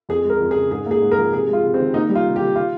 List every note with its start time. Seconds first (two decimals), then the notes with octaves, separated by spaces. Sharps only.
0.09 F2 G#4
0.24 G#3
0.30 A#4
0.40 F2
0.51 G#4
0.56 C#3
0.71 G#2 G#4
0.86 A#3 G#4
1.01 G#2
1.11 A#4
1.18 F3
1.33 C3 G#4
1.48 G#3 F4
1.64 C3
1.74 C4
1.79 D#3
1.94 A#3 D#4
2.09 G3
2.15 F4
2.25 C3
2.36 G4
2.41 D#3
2.55 F4